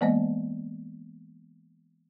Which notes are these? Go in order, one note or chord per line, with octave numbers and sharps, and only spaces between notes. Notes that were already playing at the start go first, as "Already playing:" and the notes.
E3 G#3 A#3 B3 C5 D#5